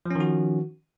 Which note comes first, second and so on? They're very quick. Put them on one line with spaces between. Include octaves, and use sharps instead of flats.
F3 C#4 D#3 F#4